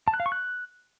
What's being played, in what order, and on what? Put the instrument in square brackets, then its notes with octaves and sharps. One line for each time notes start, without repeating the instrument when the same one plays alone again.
[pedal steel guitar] A5
F#6
F5
C#6
F#6